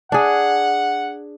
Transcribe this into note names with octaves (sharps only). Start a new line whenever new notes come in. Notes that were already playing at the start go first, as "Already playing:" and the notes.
D4 G#4 F#5